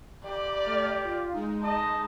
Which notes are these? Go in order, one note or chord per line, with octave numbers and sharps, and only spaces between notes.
G4 D5
A3 F6 A6
F4
G#3 D#4
D#5 A5